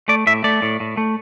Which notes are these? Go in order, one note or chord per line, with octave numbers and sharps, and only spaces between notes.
A3 D5
A2 E5
A3 D5
A2
A2
A3